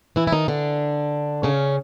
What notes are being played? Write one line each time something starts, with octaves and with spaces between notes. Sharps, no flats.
E3 E4
E4
D#3 D#4
D3 D4
C#3 C#4